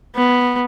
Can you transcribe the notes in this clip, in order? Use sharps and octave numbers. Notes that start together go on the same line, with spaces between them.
B3